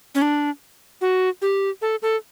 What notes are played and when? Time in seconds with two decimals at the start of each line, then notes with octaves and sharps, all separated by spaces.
0.15 C#4
0.22 D4
1.01 F#4
1.42 G4
1.82 A4
2.02 A4